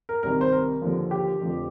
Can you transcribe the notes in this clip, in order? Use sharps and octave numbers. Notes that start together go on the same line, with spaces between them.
A#4
C2 C3 D#3 A#4
C5
A#4
D#2 D3 F3
G4
F1 F2 D3 F3